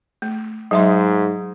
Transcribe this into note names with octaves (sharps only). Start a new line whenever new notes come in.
A3
G#2 F#3 E5 C6